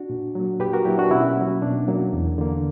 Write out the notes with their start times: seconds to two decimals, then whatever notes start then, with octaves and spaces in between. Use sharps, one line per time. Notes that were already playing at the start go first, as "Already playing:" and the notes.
Already playing: D4 F#4
0.10 A#2
0.35 F#3 A#3
0.60 A#2 G4 B4
0.73 F#4 A#4
0.85 F#3 A#3 E4 G4
0.98 D4 F#4
1.11 B2 C#4 E4
1.37 F#3 A#3
1.62 B2 D4
1.88 F#3 A#3
2.13 E2
2.38 D3 A#3